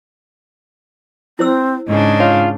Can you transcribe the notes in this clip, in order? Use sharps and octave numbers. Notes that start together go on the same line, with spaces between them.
C4 E4 C5 E6
G#2 C#3 D4 D#5
F4 C#5